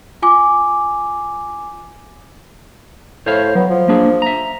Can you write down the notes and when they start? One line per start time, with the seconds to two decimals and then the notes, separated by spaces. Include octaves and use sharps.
0.22 F4 G#5 D6
3.26 A2 C5 C#5 F5
3.55 F#3 B3
3.70 F3
3.88 A#3 D4 G#4
4.22 E5 A#5